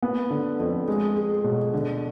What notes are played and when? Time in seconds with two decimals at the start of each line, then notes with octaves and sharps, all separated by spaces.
0.02 B3
0.30 D3
0.59 F2
0.88 G#3
1.16 G#4
1.44 B2
1.73 D3